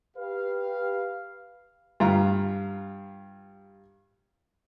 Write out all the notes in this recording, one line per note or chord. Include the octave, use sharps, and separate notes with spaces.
G4 B4 F5
G2 F4 A#5